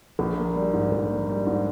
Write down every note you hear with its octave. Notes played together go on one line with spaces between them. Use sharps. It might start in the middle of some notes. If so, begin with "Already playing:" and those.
A#1
A#3
G3
G#2
A#1
A#3
G3
G#2